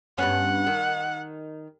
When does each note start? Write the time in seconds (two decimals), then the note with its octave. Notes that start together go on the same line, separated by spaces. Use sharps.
0.18 G2 B3 C#4 F#5
0.67 D#3